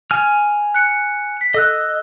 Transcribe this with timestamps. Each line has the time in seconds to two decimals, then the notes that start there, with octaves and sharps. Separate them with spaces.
0.11 G#5 F6
0.74 F#6 C#7
1.41 B6
1.54 A4 D#5 E6 F#6